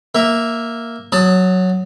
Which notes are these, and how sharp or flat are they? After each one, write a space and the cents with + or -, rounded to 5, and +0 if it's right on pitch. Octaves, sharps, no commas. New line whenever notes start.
A#3 +0 E5 +0
F#3 +0 A5 +25 D#6 +0